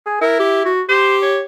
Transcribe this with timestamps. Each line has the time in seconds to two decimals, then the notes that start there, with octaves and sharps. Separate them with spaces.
0.06 G#4
0.21 E4 A#4
0.39 G4
0.65 F#4
0.89 G4 C5
1.22 C#5